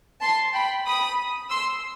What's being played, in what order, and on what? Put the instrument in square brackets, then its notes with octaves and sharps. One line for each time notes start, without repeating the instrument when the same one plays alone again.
[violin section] A5 C6
G5 B5
B5 D#6
C6 E6